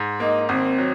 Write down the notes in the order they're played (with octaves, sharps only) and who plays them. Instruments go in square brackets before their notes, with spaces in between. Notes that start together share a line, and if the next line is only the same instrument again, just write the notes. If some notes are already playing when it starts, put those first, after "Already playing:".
Already playing: [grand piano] G#2
[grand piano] A#3 [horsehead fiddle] D#4
[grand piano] G#1 [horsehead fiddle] C4
[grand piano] F#3